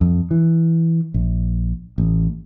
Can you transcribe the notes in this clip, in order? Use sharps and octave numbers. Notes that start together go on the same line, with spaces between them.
F2
E3
A#1
A1